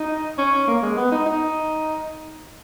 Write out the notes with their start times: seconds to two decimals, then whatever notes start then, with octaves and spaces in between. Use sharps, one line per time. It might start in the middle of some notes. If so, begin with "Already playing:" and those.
Already playing: D#4
0.38 C#4
0.68 A#3
0.82 G#3
0.97 B3
1.12 D#4
1.26 D#4